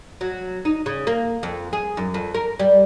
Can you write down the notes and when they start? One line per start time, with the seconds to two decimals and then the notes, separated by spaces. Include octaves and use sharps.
0.21 F#3
0.65 D#4
0.86 C#3
1.07 A#3
1.43 F2
1.73 G#4
1.97 F#2
2.14 F2
2.34 A#4
2.60 G3